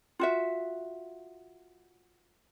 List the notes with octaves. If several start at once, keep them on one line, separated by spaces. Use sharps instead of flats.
F4 F#4 E5